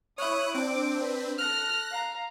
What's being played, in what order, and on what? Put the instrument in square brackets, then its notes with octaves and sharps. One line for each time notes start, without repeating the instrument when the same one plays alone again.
[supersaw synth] E4 C#5 [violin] D#6 F#6
[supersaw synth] C4 D4 [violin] D6
[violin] B4
[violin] A4 F6 [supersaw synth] F#6 A#6
[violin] F5 A#5